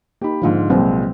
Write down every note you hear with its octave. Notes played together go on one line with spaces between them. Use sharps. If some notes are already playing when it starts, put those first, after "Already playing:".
A#3 D#4 G4 B5
G#2 D3 F3 F4
C2 A#2 F#3 G#3 C4 B4